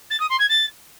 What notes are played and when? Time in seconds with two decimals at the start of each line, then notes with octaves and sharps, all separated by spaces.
0.10 A6
0.20 D#6
0.29 C6
0.39 G#6
0.49 A6